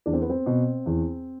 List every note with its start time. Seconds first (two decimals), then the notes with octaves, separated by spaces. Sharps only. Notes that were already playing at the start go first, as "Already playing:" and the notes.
0.06 E2 D4
0.13 C4
0.22 B3
0.30 C4
0.46 B2
0.86 E2